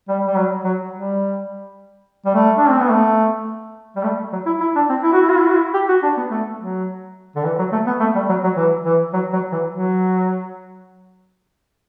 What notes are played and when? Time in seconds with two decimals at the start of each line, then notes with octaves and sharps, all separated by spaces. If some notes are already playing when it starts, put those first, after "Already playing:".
0.08 G3
0.27 G3
0.36 F#3
0.64 F#3
0.93 G3
2.26 G3
2.34 A3
2.58 D4
2.69 C4
2.80 B3
2.91 A3
3.96 G3
4.04 A3
4.33 F#3
4.46 E4
4.61 E4
4.76 D4
4.90 C4
5.03 E4
5.13 F#4
5.21 E4
5.30 F#4
5.38 E4
5.47 F#4
5.56 E4
5.74 G4
5.89 F#4
6.03 D4
6.17 B3
6.31 A3
6.59 F#3
7.36 D3
7.44 E3
7.58 F#3
7.72 A3
7.87 B3
8.00 A3
8.15 G3
8.29 F#3
8.44 F#3
8.57 E3
8.85 E3
9.13 F#3
9.33 F#3
9.52 E3
9.70 F#3